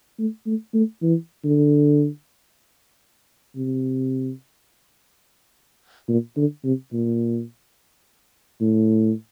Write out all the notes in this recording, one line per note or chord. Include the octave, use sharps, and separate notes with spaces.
A3
A3
A3
E3
D3
C3
A#2
D3
C3
A#2
A2